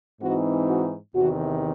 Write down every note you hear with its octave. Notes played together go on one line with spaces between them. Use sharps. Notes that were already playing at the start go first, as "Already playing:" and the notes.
G#2 E3 C4 D#4 F#4
F#4
E2 C3 D#3 F#4